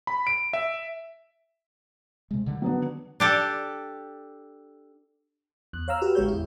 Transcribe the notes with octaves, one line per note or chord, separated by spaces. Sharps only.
B5
D7
E5
C3 G#3
D3 D#3 G3
F#3 B3 D4
D4 G4 A4
E2 F#6
C#5 F5 A#5 E6 F6
F#4 G4 B4
A1 D3 G#3 G4 C#5 G6
E2 E4